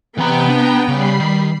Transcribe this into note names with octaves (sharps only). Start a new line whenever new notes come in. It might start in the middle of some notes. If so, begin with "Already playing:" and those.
C3 E3 B3 G5 A#5
D4 A#5
C#3 G3 B5 C7
D#3